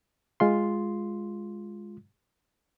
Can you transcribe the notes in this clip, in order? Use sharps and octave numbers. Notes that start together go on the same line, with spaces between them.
G#3 F4 C6